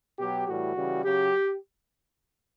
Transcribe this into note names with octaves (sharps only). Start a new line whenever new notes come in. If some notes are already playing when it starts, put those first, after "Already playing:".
B2 F#3 G4
A2 E3 G3 F#4
C#3 E3 G3
C#3 F#3 G4